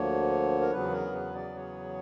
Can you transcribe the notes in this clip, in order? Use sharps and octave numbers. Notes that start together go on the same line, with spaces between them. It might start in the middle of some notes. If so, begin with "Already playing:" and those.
Already playing: D2 D3 F3 A#3 C#5
A#4
E2 C#3 F#3 B3 B4
A#4
B4
D5
C#5